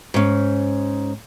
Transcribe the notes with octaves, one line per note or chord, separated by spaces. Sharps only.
G#2 C#4